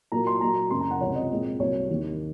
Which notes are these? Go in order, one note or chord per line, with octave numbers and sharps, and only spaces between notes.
A#2 F#3 A#3 A#5
C6
A#2 F#3 A#3 A#5
F#2 C#3 F#3 A#3 C6
A#5
F#5
C#2 C3 F3 C#5
D#5
A#2 G#3 C4
C2 C3 F#3 A#3 C#5
D#2 D#3 A#3